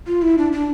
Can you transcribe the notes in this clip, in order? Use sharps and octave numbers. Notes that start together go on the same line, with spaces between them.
F4
E4
D4
D4